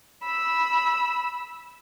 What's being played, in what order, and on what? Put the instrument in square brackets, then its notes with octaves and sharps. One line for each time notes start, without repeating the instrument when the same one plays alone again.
[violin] B5 E6